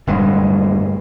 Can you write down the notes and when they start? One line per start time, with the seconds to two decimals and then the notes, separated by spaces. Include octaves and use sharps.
0.07 D1 G2 G#3